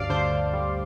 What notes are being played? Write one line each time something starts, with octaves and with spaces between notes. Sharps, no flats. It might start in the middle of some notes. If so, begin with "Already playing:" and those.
Already playing: D2 G2 D5 F5
D3 C5
D3
G3